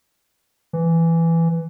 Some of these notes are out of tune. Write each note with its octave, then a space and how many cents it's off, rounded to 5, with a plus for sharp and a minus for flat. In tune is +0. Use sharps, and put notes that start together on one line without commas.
E3 +10